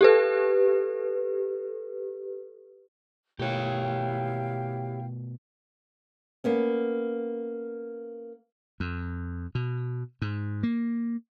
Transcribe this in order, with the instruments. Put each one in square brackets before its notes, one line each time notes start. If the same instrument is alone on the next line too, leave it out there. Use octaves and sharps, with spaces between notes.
[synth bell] G4 A4 B4
[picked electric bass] B2 A3 [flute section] E4 F5 G5 [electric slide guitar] G4 C#5
[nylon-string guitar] A#3 B3 C#4
[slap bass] F2
B2
G#2
A#3